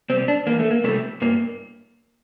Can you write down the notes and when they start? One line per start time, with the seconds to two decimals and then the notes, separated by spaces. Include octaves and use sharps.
0.10 C3 G3 C4
0.28 D4
0.47 E2 A#3
0.59 A3
0.71 A#3
0.84 C3 G3 A3
1.22 G2 A#3